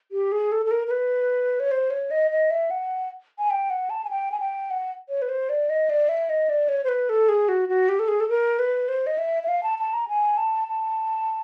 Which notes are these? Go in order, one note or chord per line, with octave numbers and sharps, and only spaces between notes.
G4
G#4
A4
A4
A#4
A#4
B4
C#5
C5
C#5
D#5
D#5
E5
F#5
G#5
G5
F#5
A5
G#5
G5
G#5
G5
F#5
C#5
B4
C5
D5
D#5
D5
E5
D#5
D5
C#5
C5
B4
A4
G#4
F#4
F#4
G4
A4
G#4
A4
A#4
B4
C5
D#5
E5
E5
F5
A5
A5
A#5
G#5
A5
A5